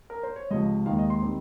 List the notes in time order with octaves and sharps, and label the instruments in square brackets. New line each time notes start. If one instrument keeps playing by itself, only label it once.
[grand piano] A#4
C5
C#5
C#2 C3 F3 D#5
D#2 D#3 G#3 D#4 F5
D#5
C6
D#3 G3 C4